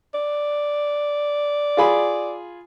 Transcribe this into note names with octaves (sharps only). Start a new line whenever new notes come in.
D5
F4 G#4 B5